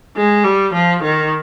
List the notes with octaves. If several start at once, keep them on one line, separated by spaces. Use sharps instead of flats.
G#3
G3
F3
D#3